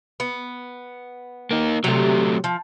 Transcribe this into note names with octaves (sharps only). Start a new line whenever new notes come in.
B3
A#3 D#4
C3 F#3 A3 A#5
F3